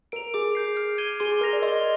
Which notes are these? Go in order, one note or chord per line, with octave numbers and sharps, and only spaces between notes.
A#4 D7 F7
G#4 D6
G6 C7
F6
G#6 D#7 G7
G#4 C6
G#4
A#4 F6 A#6 F7
D5
D#5 C6